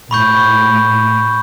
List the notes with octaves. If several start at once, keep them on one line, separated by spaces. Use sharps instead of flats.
A2 B5 C#6 G6